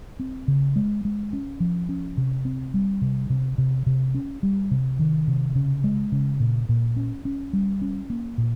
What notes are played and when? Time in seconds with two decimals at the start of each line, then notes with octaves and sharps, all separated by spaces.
0.20 C4
0.48 C#3
0.76 G#3
1.05 G#3
1.33 C#4
1.60 F3
1.89 C#4
2.17 C3
2.45 C4
2.74 G3
3.02 C3
3.30 C3
3.58 C3
3.86 C3
4.15 C#4
4.43 G3
4.71 C3
4.99 D#3
5.28 C3
5.55 C#3
5.84 G#3
6.12 C#3
6.40 A#2
6.69 A#2
6.96 C#4
7.25 C#4
7.53 G3
7.82 C#4
8.10 A#3
8.38 A#2